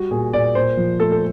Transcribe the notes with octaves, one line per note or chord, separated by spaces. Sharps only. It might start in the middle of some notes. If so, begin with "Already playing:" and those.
Already playing: G3 F#4
A#2 G#4
A#2 D5
A#2 C5
F3
A3 A4
A4